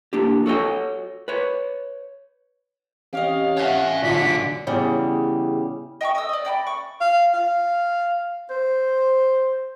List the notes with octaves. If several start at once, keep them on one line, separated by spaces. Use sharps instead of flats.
A#3 D4 G4
F#4 A4 C#5 D#5
B4 C#5
E3 C4 C#4 G4 C#5 D#5 F5
C#5 E5 F#5 G#5 F#6
B1 D3 F4 F#4 D5 B6
E2 C#3 G3
D#5 G5 A#5 C#6
D#5 D#6 E6
D5 D#5
D5 G5 A5 B5
C#6
F5
F5
C5